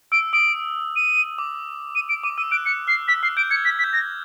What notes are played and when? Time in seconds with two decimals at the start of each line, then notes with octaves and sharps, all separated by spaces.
0.12 E6 D7
0.33 D#6 D7
0.96 D#7
1.38 D6
1.95 D#7
2.09 D7
2.23 D6 D#7
2.37 E6 D#7
2.51 F#6 D7
2.66 F#6 C#7
2.87 F6 C7
3.08 E6 B6
3.23 F6 C7
3.37 G6 D7
3.50 G#6 C#7
3.65 B6
3.79 B6
3.84 G6
3.93 G#6 A#6